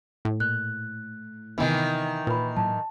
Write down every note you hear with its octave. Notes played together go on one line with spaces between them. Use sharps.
A2
A#2 F#6
C3 D#3 E3 B3 C4
A#2 B4 B5
A2 F#3 A5